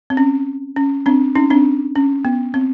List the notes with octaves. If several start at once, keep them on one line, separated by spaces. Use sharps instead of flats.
C4
C#4
C#4
C4 D4
C#4 D#4
C4 D4
C#4
B3
C4